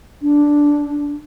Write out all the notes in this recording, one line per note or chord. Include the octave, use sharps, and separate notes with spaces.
D4